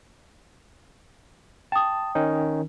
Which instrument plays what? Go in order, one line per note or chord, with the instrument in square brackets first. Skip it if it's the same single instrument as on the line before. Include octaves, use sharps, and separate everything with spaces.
[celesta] G5 D#6 [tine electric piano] A5
[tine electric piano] D#3 C#4 D#4